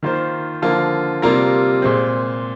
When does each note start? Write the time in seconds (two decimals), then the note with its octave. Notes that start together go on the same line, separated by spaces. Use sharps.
0.03 D#3 A#3 F4 C5
0.62 D3 F3 A#3 F4
1.22 C3 G3 A#3 F4 A#4
1.82 A#2 G#3 C4